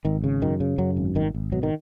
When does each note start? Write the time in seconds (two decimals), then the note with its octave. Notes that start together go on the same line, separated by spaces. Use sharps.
0.05 G#1 D#3
0.24 C#3
0.42 F#2 D#3
0.60 C#3
0.78 F#2 F#3
0.97 G#1
1.15 G#1 D#3
1.34 G#1
1.52 B2 F#3
1.63 D#3